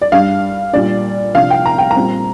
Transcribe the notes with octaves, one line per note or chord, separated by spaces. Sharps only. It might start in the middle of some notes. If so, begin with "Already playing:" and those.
D5
G2 G3 D4 F5
A#2 G3 D4 D5
C3 F3 D4 F5
G5
A#5
G5
A#5
A#2 G3 C4